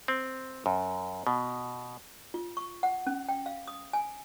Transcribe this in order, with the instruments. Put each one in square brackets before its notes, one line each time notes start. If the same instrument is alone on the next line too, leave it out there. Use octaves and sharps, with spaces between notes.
[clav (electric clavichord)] C4
F#2
B2
[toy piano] F4
C#6
F#5
C#4
G5
F5
D#6
G#5